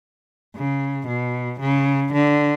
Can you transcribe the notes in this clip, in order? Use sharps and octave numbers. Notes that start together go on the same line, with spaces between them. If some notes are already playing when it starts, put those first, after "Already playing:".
C#3
B2
C#3
D3